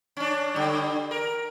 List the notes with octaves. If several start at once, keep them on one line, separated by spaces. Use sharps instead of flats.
C#4 D4
D3 G3
A#4